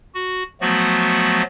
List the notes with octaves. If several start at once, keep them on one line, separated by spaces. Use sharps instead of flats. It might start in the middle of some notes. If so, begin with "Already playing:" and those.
F#4
F3 F#3 A3 B3 F#4